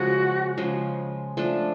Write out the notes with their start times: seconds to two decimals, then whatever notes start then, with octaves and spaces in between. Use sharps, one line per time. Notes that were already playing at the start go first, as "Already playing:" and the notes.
Already playing: C#3 F3 G#3 F#4
0.58 C#3 F3 G#3
1.37 F3 A3 D4